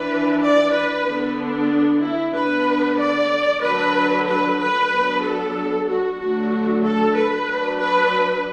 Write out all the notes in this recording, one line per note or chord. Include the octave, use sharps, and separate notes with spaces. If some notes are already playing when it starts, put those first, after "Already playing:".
Already playing: E3 D4 B4
D5
B4
D3 B3 D4
D4
E4
D3 B3 D4 B4
D5
D3 F#3 D4 B4
B4
B4
F#3 B3 D4
A4
F#4
D3 F#3 A3 D4 F#4
A4
B4
F#3 D4
B4